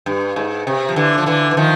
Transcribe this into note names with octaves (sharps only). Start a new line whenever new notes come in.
G2
G#2
C3
F3
D3 E3
F3
D3 E3
E3
D#3 F3